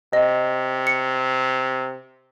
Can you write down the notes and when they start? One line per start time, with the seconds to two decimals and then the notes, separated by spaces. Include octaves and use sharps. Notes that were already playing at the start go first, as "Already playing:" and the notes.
0.13 C3 D#5
0.87 C#7